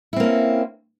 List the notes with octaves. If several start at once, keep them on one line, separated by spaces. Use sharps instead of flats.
A#3 C4 C#4 E4